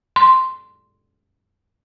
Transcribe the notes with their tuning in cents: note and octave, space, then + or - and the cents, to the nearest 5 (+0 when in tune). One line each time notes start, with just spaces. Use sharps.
C6 +0